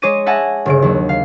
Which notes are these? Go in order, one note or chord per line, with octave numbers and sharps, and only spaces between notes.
G#3 G#4 C#5 D6 A#6 D#7
E5 F#5 G#5 A5 G#6 A#6
G1 C#3 D7
D#2 F#3
F5